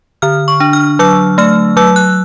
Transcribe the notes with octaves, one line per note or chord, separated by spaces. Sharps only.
D3 F6
C#6
D4
F6
F#3 E6
A3 F6
F#3 E6
F#6